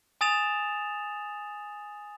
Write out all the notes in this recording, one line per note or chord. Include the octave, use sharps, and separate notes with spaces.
G#5 D#6 A6 E7 F7